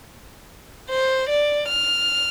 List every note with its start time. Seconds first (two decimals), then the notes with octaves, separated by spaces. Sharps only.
0.90 C5
1.30 D5
1.68 F6